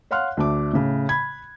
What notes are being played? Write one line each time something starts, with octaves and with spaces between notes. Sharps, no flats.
C#5 F5 F#5 C6 F6 F#6
D2 A3 D4 D6
A2 C#3
B5 G#6